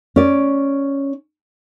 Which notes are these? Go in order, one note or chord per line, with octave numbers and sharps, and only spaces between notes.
C#4 D5